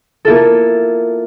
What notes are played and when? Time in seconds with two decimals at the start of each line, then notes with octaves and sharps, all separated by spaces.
0.25 A#3 E4 F4 A4